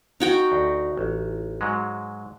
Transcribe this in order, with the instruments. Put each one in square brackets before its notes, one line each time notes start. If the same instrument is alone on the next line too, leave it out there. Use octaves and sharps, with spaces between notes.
[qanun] D#4 F#4 G5
[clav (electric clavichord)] D2
A1
G#2 F#3 G#3